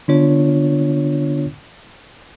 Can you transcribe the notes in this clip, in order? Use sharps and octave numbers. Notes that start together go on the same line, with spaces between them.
D3 B3 D4 F4 C#5